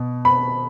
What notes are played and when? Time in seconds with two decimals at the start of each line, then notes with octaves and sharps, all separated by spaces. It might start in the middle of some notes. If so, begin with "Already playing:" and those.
Already playing: B2
0.25 B5